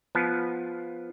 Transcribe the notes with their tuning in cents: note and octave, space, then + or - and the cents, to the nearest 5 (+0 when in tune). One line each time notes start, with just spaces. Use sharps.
F3 +0 B3 +0 A5 -30